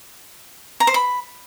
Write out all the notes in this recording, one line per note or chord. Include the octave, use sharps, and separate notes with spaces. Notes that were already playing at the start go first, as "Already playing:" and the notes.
A#5
C5
B5